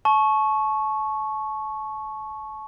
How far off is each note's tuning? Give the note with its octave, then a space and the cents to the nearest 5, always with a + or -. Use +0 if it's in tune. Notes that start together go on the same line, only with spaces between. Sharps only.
A5 -35 C#6 -5